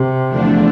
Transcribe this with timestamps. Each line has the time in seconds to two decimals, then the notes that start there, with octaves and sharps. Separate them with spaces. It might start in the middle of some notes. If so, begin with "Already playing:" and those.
Already playing: C3
0.29 E2 D3 F3 A3 D4